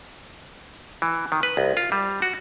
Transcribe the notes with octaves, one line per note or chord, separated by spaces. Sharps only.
E3
D#3
B4
C2
F4
G3
F#4